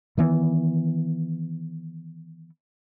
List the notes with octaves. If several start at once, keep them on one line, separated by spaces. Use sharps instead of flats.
D#3 E3 B3